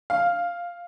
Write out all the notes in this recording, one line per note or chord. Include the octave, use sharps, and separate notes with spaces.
F5